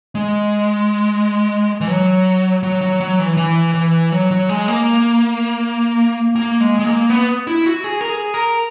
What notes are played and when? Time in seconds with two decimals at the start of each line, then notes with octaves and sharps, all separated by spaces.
0.15 G#3
1.81 E3
1.88 F#3
2.63 F#3
2.81 F#3
3.00 F#3
3.19 E3
3.37 E3
3.75 E3
4.12 F#3
4.31 F#3
4.49 G#3
4.68 A#3
6.36 A#3
6.60 G#3
6.79 G#3
6.85 A#3
7.10 B3
7.47 E4
7.66 F#4
7.84 G#4
8.01 A#4
8.09 G#4
8.34 A#4